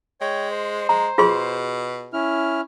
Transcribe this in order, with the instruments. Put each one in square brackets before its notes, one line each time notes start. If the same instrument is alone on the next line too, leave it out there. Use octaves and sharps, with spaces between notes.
[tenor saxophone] G#3 [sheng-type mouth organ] C#5 G5
[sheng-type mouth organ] C5
[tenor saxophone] G#3 [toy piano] A#5
[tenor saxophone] B2 [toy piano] F4 G#4 C6
[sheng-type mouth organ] C#4 E4 F6